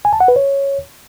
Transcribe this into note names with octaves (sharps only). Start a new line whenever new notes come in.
G#5
A5
F#5
B4
C#5